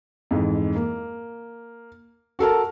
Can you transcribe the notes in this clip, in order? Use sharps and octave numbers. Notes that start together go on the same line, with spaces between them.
F2 G#2 E3
A#3
F#4 A4 A#4 A5